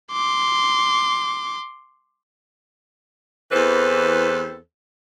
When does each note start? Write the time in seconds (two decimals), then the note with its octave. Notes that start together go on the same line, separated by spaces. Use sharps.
0.12 C6 D6
3.51 E2 E3 C4 A4 B4 C5